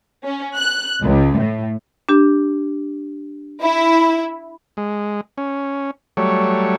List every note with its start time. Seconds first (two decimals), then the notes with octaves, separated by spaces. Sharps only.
0.24 C#4
0.56 F#6
1.01 C#2
1.37 A2
2.09 D4 G4
3.61 E4
4.77 G#3
5.38 C#4
6.17 F#3 G3 A3 C#5